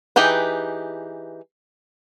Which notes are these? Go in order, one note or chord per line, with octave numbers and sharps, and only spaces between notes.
E3 D#4 G4 G#4 B4